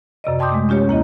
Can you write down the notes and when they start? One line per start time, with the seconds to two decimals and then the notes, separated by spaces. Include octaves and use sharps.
0.24 F#2 C3 D5 D#5
0.39 G5 A5 C6 D6 D#6 G6
0.52 G#3 A3
0.69 C#4 F4 G4 C#5
0.88 D#2 A#3 E4 D#5